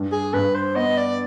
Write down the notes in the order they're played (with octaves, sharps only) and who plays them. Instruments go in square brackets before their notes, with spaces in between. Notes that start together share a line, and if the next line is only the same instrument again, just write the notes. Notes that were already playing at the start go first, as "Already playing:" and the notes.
Already playing: [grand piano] G2
[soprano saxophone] G#4
[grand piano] G2 [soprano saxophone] B4
[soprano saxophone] C5
[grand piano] B3 [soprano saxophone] D#5
[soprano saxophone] D5